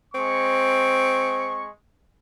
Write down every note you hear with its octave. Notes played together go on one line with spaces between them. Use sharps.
G#3 C4 C#6